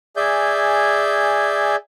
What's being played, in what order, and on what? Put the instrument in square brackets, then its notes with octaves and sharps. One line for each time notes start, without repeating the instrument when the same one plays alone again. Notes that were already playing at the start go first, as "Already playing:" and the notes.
[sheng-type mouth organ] G#4 D5 E5 G#5 G6